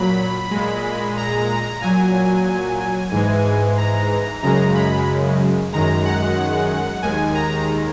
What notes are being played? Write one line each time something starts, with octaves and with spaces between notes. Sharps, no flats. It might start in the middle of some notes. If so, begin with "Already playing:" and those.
Already playing: A#2 F#3 B5
G#3
A#2
A#5
A#2 F#3 G#5
G#2 E3 G#3
A#5
F#2 C#3 G#3 A#5
B5
F#2 D#3 G#3 A#5
F#5
F#5
D#2 D#3 G#3 G#5
A#5